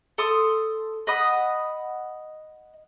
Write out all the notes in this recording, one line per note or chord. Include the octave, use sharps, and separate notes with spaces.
A4 C6 D#6
D#5 F#5 B5 D#6